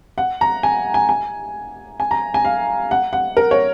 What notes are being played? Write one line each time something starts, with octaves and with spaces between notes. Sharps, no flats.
F#5
A#5
G#5
G#5
G#5
G#5
A#5
G#5
F5
F#5
F#5
A#4
C#5